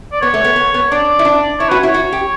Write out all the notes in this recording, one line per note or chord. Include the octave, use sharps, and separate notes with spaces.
D5
B3 C#5
A3
B3
B3
B3
D4 D5
E4
D4
E4 C#5
F#4 B4
E4
C#5
F#4
G4